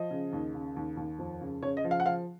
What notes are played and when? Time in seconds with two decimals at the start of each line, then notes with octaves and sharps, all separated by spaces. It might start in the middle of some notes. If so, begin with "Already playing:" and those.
Already playing: F3 D#5
0.11 C#3
0.33 D#2
0.54 C#3
0.76 D#2
0.97 D#2
1.19 F2
1.41 C#3
1.62 C#3 C#5
1.77 D#5
1.84 F3
1.91 F5
2.00 F#5
2.05 F3 F5